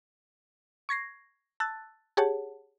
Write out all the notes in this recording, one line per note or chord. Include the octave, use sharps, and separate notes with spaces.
C#6 G#6 A#6 C7
A5 E6 F#6 A6
G4 G#4 C#5 F#5 A5